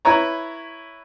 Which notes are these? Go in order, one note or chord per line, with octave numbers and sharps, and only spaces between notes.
E4 B4 C#5 A#5